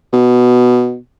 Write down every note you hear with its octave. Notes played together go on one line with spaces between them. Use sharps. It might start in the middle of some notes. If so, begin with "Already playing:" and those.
B2